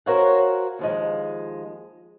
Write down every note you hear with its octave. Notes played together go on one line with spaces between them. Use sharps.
F#4 A#4 C5 C#5 F5 F#5
D#2 F3 G#3